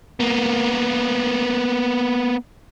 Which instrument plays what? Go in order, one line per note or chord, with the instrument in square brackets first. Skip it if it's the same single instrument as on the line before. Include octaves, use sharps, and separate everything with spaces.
[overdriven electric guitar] A#3 B3